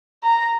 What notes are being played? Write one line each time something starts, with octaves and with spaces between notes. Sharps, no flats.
A#5